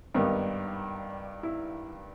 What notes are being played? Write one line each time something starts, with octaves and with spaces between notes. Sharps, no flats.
G#1 G2 D#3 G3 B3 D#4
E4